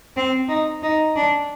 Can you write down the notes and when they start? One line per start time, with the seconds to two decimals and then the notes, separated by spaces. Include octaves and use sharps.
0.17 C4
0.48 D#4
0.83 D#4
1.16 D4